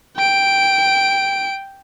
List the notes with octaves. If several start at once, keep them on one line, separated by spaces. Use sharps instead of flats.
G5 D7